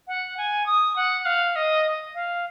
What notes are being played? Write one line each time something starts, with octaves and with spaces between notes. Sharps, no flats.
F#5
G#5
D#6
F#5
F5
D#5
F5